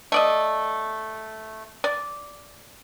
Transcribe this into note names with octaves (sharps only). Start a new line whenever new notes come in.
A3 D5 D#5
D5